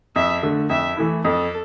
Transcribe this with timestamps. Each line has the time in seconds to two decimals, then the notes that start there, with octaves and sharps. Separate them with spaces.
0.16 F2 E5
0.43 D3 A3
0.70 F2 E5
0.97 E3 A3 E4
1.24 F2 A4